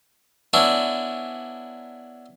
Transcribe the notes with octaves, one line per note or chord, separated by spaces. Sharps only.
B3 C#4 D4 E4